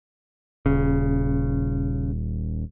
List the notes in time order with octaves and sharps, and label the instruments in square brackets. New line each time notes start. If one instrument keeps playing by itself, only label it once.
[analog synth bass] D#1 [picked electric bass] C#3